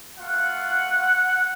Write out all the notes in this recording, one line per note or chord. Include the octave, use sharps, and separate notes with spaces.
A3 F4 F#5